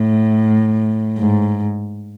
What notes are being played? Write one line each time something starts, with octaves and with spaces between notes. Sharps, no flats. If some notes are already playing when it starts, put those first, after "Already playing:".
Already playing: A2
G#2